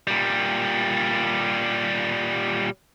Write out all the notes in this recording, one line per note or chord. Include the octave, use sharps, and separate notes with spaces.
A#2 G3